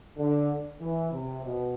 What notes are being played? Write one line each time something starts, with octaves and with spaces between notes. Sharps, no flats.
D3
E3
C3
B2